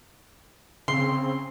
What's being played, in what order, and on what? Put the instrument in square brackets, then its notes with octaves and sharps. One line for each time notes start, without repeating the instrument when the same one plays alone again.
[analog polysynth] C#3 C4 [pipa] C6